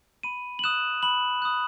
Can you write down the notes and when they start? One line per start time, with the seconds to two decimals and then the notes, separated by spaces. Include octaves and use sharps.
0.23 B5 D#7
0.59 F#7
0.64 D#6 F#6 E7
1.03 B5 F#7
1.42 D#6 F#6